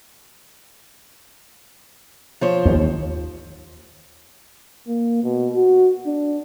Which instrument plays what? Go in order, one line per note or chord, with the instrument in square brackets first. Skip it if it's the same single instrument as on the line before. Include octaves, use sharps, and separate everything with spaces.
[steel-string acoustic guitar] F3 C5 C#5
[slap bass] D#2
[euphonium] A#3
B2
F#4
D4